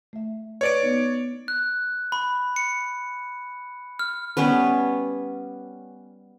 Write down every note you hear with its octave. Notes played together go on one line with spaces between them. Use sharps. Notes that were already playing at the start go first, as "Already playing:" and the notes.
A3 E5
B4 C#5 D5 D7
B3 D#4
F#6
B5
C#7
F6
G3 B3 C#4 B4